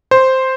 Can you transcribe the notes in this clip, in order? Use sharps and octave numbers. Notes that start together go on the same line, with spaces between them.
C5